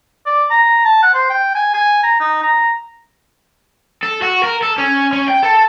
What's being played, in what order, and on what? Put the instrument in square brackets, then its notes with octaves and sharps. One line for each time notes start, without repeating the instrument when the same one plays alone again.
[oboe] D5
A#5
A5
F#5
C5
G5
G#5
G#5
A#5
D#4
A#5
[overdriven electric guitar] A4
F#4
A#4
A4
C#4
C#4
G5
A4